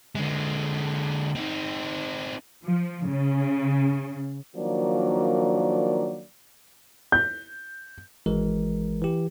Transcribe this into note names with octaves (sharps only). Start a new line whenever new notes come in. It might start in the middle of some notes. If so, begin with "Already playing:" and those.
D3 G#3
C4 D#4
F3
C#3
D#3 F3 F#3 A#3 D4 D5
G6
G#1 E3 G#3 A#4
E3 G4